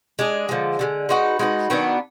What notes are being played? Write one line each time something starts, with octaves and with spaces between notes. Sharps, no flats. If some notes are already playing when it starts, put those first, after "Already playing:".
G#3 D4 G#4
D3 F3 G#3
D3 F3 G#3
G#3 D#4 F#4 B4
G#3 D#4 F#4 B4
D#3 F#3 B3 D4